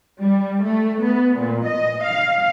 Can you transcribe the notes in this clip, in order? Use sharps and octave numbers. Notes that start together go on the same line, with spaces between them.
G3
A3
B3
A#2
D#5
F5